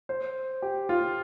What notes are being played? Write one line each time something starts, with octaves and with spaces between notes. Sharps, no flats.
C5
G4
F4